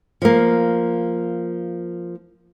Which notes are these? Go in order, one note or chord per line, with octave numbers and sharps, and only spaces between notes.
F3 A#3